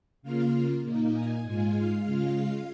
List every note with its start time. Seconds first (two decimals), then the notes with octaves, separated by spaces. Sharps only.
0.22 C#3 A#3 F4 F5
0.83 A#2 A#3 D#4
1.13 G#5
1.43 G#2 G#3 F4 G#5
1.73 F5
2.03 C#3 G#3 F4